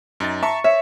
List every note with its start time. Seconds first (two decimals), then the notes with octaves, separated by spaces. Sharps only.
0.20 F#2 D#4 A6
0.43 E5 A5 A#5 C#6
0.64 C#5 E5